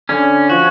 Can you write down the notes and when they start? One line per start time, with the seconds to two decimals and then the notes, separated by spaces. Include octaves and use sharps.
0.09 D3 C#4
0.49 F3 F#4